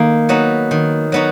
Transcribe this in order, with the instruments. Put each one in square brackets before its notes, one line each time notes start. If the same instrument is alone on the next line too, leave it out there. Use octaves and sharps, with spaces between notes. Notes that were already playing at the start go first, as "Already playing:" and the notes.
Already playing: [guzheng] D#3 [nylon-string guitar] A#3
[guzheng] F#3 B3 D#4 F#4
D#3
F#3 B3 D#4 F#4